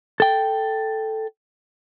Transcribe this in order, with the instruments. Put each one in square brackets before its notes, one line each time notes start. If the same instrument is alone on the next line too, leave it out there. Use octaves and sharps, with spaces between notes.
[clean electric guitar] A4 G5